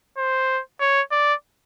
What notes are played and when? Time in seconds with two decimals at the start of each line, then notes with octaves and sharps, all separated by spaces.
0.17 C5
0.80 C#5
1.12 D5